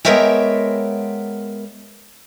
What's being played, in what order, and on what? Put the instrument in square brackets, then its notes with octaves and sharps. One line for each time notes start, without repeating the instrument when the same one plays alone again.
[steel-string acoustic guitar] G#3 B3 A#4 C#5 E5 G5